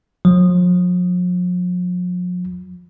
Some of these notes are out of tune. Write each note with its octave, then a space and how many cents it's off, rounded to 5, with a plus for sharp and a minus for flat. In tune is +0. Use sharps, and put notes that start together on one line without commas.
F3 +45